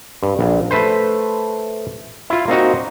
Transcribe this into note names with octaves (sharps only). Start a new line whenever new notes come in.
G2
A#1
A3 B4 C5
E4 F4
A#3 C4 D#4 F#4